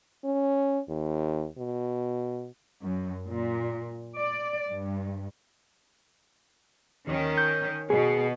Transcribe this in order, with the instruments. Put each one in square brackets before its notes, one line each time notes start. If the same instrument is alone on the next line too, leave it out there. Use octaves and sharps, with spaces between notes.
[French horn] C#4
D#2
B2
[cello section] F#2
A#2
D5
G2
[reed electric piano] D#2 [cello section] D#3 C#4
[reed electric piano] G6
[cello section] B2 [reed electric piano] G#4